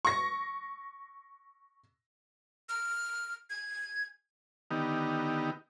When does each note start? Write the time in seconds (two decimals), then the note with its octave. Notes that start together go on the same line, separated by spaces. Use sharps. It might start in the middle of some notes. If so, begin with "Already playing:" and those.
0.05 C#6 A#6
2.69 F6
3.50 G#6
4.71 D3 D#3 B3 D#4 G4